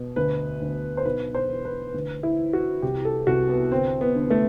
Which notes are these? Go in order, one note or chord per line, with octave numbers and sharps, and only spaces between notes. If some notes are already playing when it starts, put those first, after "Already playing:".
Already playing: B2
D2 B4
D2
C5
B1 B4
C5
E3
B4
D2
E4
E3
F#4
C2 G4
A4
C2 F#4
B3
G1 C4
B3
D3
A3